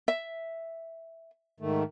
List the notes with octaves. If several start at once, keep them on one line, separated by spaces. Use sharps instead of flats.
E5
G#2 D#3 A3